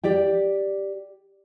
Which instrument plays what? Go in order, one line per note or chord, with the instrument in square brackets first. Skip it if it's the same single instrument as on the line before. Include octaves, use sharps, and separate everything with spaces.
[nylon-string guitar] G4 D5 G5